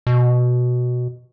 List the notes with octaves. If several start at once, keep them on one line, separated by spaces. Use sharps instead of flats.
B2